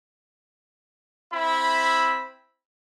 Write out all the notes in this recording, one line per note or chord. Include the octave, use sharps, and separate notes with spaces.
C4 E4 E5 B5